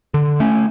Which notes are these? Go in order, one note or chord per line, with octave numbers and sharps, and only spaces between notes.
D3
A3 C#4